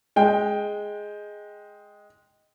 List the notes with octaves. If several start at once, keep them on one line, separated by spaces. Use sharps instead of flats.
G#3 G5